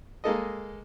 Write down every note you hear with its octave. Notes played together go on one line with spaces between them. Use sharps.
G#3 A#3 A4 D#5